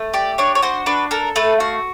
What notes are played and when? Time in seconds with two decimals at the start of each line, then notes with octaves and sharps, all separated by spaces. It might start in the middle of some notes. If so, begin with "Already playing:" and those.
Already playing: A3
0.14 G4 D5
0.38 D4 C#5
0.55 C#5
0.62 F#4 C5
0.86 D4 B4
1.11 A4 A#4
1.36 A3 B4
1.60 F#4 F5